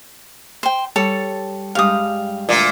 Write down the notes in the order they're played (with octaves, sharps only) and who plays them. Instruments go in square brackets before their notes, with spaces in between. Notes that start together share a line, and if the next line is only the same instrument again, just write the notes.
[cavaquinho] C5 G5
[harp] G3 [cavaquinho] A4 C#5 A5
[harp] G2 G3 G#3 [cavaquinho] F5 D#6
[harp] D2 [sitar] A#2